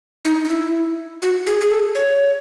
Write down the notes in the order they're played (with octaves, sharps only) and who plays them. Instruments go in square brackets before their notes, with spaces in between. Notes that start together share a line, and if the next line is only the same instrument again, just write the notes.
[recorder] D#4
D#4
E4
F#4
G#4
G#4
A4
C#5